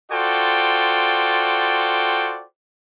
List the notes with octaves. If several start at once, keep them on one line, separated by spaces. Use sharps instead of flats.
F4 F#4 A4 C5 D5 G5